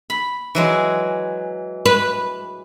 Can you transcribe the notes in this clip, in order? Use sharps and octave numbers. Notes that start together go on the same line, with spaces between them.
B5
E3 F#3 G#3
B4